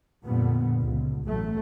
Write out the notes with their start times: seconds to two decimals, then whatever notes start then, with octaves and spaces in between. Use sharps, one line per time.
0.24 F2 A#2 D3 G3 B3
0.81 C#2 G2
1.23 A1 F#3 A3